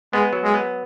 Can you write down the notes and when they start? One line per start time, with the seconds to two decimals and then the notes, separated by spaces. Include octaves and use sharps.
0.13 G#3 B3
0.33 F#3
0.44 G#3
0.54 B3